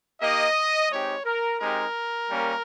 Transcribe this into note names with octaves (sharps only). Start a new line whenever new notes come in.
A#3 D#4 G4 D#5
G#3 C4 D#4 G4 C#5
A#4
G#3 C4 D#4 G4 A#4
G3 A#3 C#4